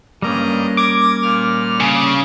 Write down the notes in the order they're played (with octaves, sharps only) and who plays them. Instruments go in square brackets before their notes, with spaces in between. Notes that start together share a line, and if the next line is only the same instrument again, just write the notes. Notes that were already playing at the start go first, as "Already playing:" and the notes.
[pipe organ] G2 D#5 A#5 [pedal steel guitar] G3 A#3 C#4
[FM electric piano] D6 [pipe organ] G#6 A#6
[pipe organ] A#2 F6
[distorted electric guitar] C#3